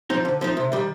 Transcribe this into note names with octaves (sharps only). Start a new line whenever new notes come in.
F3 C4 D#4
D3
F3 C4 D#4
C3
D#3 G3